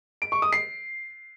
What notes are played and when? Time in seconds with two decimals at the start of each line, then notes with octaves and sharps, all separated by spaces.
0.22 D7
0.32 C#6
0.42 D#6
0.53 C7